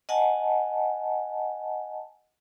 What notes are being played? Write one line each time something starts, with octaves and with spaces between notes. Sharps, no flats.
D#5 F#5 G#5 A5